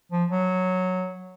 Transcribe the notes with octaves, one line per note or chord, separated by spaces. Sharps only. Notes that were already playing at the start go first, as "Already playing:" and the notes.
F3
F#3